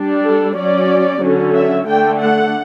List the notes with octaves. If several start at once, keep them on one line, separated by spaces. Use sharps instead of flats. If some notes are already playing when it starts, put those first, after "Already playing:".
Already playing: G3 D4
A4
F#3 C#4 D5
D3 F#3 C#4
E5
D3 A3 D4 G5
F#5